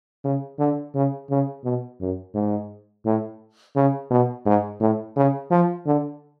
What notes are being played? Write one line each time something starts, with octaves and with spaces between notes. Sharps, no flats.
C#3
D3
C#3
C#3
B2
F#2
G#2
A2
C#3
B2
G#2
A2
C#3
F3
D3